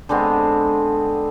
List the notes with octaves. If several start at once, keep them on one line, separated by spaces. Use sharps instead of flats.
D3 G#3 B3 C4